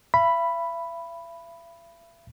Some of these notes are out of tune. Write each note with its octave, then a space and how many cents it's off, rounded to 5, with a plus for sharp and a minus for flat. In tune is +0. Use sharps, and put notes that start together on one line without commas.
E5 +40 B5 +0